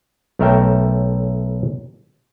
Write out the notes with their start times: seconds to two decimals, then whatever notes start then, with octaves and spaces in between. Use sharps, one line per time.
0.39 B1 A3 A#4 C#5 E5 G5